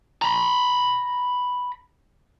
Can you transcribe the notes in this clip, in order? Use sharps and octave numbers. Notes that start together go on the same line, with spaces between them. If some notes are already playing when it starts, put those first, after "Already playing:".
A#5 B5